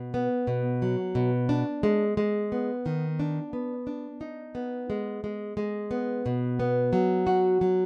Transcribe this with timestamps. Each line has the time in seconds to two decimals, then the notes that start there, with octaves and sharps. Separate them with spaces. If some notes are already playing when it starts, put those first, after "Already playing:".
Already playing: B2
0.14 B3
0.47 B2
0.82 F#3
1.15 B2
1.49 D4
1.83 G#3
2.17 G#3
2.52 B3
2.86 D#3
3.20 D4
3.53 B3
3.87 D4
4.21 D#4
4.55 B3
4.90 G#3
5.24 G#3
5.57 G#3
5.91 B3
6.26 B2
6.60 B3
6.93 F#3
7.27 F#4
7.61 F#3